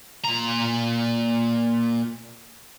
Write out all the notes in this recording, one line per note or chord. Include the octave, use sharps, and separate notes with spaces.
A#2 A#5